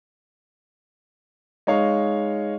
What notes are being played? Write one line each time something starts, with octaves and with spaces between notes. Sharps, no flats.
G#3 D#4 C#5 F5